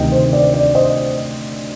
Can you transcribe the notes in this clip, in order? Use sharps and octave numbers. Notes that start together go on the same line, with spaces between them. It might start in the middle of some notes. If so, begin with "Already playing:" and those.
Already playing: D2 C3 D#3 D#5 G5
C5
D5
D5
C5 D#5